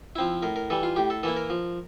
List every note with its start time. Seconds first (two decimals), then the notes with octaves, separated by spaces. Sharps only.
0.16 F3 C4 E4
0.42 A2 A#4
0.56 A#4
0.70 E3 G3 A4
0.83 F4
0.96 A2 G4
1.10 A4
1.23 E3 A#3 E4 A4
1.36 A#4
1.50 F3